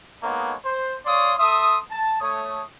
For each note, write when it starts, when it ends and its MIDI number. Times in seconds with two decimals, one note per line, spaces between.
0.22 0.55 56
0.22 0.55 58
0.22 0.55 59
0.22 0.55 63
0.22 0.55 69
0.22 0.55 73
0.64 0.96 72
1.06 1.34 73
1.06 1.34 74
1.06 1.34 77
1.06 1.34 84
1.06 1.34 85
1.06 1.34 87
1.38 1.79 69
1.38 1.79 76
1.38 1.79 84
1.38 1.79 87
1.90 2.16 81
2.21 2.63 57
2.21 2.63 73
2.21 2.63 87